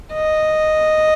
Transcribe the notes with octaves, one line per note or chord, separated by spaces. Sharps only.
D#5